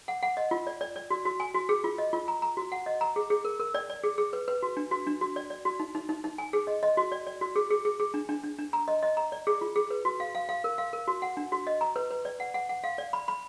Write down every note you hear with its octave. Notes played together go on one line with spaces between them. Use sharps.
F#5
F#5
D#5
F4
D5
D5
D5
F#4
F#4
G#5
F#4
G#4
F4
D#5
F4
A#5
A#5
F#4
F#5
D#5
A#5
G#4
G#4
A#4
A#4
D5
D5
G#4
G#4
B4
B4
F#4
D4
F#4
D4
F#4
D5
D5
F#4
D#4
D#4
D#4
D#4
G#5
G#4
D#5
D#5
F#4
D5
D5
F#4
G#4
G#4
G#4
G#4
D4
D4
D4
D4
A#5
D#5
D#5
A#5
D5
G#4
F4
G#4
B4
F#4
F5
F5
F5
A#4
F5
A#4
F#4
F#5
D4
F#4
D#5
A#5
B4
B4
D5
F#5
F#5
F#5
F5
D5
B5
B5